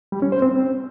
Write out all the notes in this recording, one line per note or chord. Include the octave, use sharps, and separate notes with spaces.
G3
C#4
C5
C4